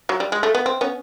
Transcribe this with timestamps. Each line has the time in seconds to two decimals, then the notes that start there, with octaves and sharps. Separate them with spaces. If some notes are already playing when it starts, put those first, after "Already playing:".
0.09 F#3
0.20 G3
0.32 G#3
0.43 A3
0.55 B3
0.66 C4
0.81 B3 C#4